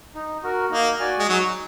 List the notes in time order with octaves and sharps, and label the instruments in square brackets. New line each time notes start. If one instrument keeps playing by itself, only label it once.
[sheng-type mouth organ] D#4
F#4 A#4
[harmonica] A#3 [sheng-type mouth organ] D#4
[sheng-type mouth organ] F#4 D5 G#5
[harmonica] G#3
[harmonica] F#3 [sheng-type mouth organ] D#4